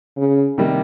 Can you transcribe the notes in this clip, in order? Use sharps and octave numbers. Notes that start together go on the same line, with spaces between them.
C#3
C3 D#3 G3 A#3